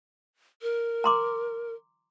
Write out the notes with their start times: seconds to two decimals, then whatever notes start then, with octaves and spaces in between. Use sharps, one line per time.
0.62 A#4
1.04 A#5 C6 D6